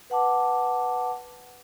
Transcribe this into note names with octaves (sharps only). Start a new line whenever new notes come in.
B4 F#5 A5 D6